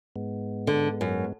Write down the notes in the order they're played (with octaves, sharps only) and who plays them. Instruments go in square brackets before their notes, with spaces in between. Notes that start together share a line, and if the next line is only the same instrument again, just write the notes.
[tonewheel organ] G#2 G#3 B3
[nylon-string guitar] D3
F#2